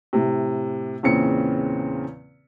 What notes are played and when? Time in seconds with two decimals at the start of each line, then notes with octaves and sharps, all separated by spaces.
0.13 A2 C3
1.03 E2 A#2 C#3 C4 C#7